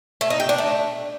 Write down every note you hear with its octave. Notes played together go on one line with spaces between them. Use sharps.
A3
D#4
G4
D4
A3